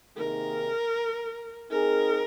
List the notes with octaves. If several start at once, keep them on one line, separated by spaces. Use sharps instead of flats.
C3 D#3 A#3 D#4 G#4 A#4
C4 D#4 G#4 A#4